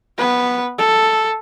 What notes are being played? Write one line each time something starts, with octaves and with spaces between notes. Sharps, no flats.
B3 B4
A4